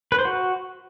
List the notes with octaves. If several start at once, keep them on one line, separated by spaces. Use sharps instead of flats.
B4
C5
F#4